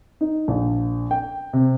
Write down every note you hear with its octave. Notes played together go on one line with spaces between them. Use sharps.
D#4
A#1
G5
C3